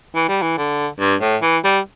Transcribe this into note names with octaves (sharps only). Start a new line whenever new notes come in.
E3
G3
E3
D3
G2
A2
E3
G3